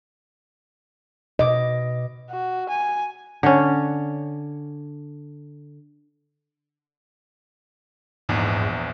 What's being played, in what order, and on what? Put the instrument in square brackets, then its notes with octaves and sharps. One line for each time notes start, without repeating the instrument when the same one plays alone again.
[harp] B2 D6 [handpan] D#5
[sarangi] F#4
G#5
[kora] D3 C#4
[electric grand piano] A#1 E2 [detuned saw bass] G#2